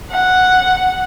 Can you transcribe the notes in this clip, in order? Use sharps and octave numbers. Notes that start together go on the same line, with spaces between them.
F#5